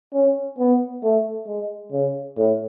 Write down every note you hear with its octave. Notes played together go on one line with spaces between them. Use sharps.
C#4
B3
A3
G#3
C#3
A2